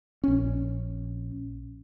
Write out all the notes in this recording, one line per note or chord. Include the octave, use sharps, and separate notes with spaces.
A#1 C#4